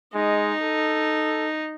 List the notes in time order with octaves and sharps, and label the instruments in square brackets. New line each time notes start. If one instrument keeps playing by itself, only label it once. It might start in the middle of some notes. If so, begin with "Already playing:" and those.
[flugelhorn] G#3 [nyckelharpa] D#4
[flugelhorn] A4